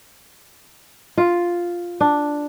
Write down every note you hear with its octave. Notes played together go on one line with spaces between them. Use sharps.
F4
D4